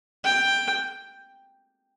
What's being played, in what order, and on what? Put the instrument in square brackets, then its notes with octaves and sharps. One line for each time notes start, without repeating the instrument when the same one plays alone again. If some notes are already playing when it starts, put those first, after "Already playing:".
[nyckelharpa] G5